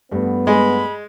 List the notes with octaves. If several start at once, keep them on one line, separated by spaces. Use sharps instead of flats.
G2 A3 B3
G#3 B5